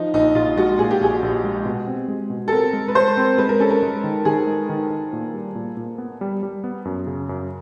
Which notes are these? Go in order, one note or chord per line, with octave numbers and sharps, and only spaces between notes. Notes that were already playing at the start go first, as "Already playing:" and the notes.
Already playing: F3 D#4
A#1 D#4
A#1 F4
G#3 F#4
A#2 G#4
G4
A#1 G#4
A#1
G#3
B2
C4
G#3
B2
A4
C4 A#4
G#3
B4
G#3 C5
C4
G#3 B4
A#4
C#4 A4
A#4
G#3
D#3
D#3 G#4
G#3
D#3
D#3
A#2
G3
A#2
A#2
B3
G3
G3
B3
F#2
C#3
F#2